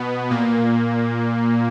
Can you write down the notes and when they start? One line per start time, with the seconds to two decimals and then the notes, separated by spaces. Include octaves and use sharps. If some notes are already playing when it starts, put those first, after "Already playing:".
Already playing: B2 B3
0.30 A#2 A#3